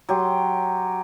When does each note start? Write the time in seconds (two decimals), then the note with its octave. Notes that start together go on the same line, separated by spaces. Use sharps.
0.09 F#3 G4 C6